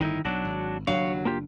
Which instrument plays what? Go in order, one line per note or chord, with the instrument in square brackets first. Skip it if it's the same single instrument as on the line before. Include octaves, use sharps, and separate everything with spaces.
[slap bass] G1 A2 [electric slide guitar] D#3 D#4 E4
[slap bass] B1 [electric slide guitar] F#3 D4 F#4
[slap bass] G#1
[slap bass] F#1 D4 [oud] D#2 F#3 F5 [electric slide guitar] C#5
[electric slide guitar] A#3 F4 G4